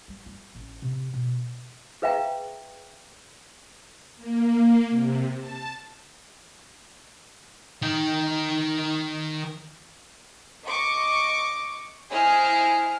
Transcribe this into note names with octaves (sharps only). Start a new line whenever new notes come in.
G3
F4
A1
C3
B2
G#4 B4 E5 F5 G5 A#5
A#3
C3
A5
D#3 G5
D#5 C#6 D6
E4 G#4 C5 D#5 F6